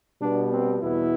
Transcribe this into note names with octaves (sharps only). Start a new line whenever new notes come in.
B2 G3 B3 D4
C4
E2 B2 B3 E4